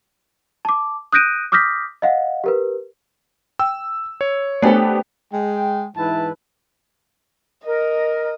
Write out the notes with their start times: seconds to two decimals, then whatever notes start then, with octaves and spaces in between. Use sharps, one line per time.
0.65 A5 D6
1.12 D#6 F#6 G6 A#6 D7 D#7
1.52 D6 D#6 F6 G6 A#6 B6
2.02 D#5 F5 F#5
2.44 G4 A#4 B4
3.59 G5 E6
4.21 C#5
4.62 A3 B3 D4 G4 A4 C5 D5 G#5
5.32 G#3 G5
5.96 G#2 E3 E4 B4 A5
7.66 A#4 D#5